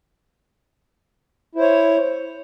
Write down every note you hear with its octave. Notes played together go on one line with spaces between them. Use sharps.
E4 C5 C#5